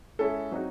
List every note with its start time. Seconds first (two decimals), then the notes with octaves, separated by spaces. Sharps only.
0.19 G#3 C#4 E4 A4
0.51 F#3 C4 D#4 F#4